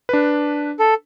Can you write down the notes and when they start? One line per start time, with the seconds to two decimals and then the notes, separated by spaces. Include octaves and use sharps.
0.09 D4 B4
0.79 A4